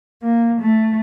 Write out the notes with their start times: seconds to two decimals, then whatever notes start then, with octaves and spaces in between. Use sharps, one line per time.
0.23 A#3
0.61 A3